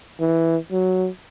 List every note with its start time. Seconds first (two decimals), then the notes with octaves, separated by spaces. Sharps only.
0.20 E3
0.72 F#3